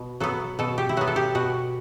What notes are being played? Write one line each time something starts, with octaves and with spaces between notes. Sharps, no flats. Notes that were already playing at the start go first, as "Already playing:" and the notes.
Already playing: B2
F#3 B3 A4
B2 A4
G4
E4
F#3 B3 F#4
A4
G4
B2 F#4